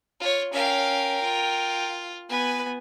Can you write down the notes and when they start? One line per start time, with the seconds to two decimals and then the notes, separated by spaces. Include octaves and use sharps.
0.20 F4 C#5
0.53 C#4 A#4 F5 G5
1.23 F4
2.30 B3 B4 G#5